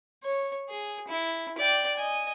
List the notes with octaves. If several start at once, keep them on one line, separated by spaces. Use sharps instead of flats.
C#5
G#4
E4
D5 G5
D#5 G#5